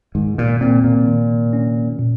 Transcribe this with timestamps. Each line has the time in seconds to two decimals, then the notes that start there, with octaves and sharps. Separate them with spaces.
0.15 G#2 D#3
0.38 A#2
0.61 A#2 C4
0.84 A#2
1.07 D#3
1.53 C#4
1.99 A#2